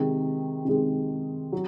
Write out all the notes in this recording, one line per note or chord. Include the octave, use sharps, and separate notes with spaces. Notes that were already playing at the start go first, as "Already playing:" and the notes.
Already playing: C3 D#3 G#3
C3 D#3 G#3
F#3